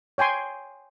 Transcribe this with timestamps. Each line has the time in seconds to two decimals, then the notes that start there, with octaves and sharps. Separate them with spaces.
0.18 C#5 G5 G#5 C6